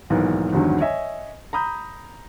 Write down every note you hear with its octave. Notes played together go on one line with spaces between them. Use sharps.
B1 G#2 D#3 E3 A#3
G#1 E2 G2 D3 D#3 F#3
C#5 D#5 E5 G#5
A#5 B5 D#6 G6